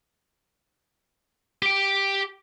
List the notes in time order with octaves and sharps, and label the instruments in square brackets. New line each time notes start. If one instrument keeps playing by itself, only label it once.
[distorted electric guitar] G4 G5